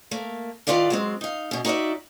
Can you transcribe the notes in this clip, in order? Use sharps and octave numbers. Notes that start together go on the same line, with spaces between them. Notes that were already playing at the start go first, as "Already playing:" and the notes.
A3 A#3
A2 D#3 F4 B4 D5 F5
F#3 G#3 C4
D#4 F5
F#2 B2
D#4 F#4 A#4 C#5 D5 E5